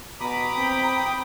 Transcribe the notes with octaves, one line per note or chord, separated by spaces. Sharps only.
B2 A#5 B5 D6 D#6
C4 G5